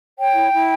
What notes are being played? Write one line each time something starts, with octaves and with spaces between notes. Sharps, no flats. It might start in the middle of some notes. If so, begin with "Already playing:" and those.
C#5 G5
E4
E4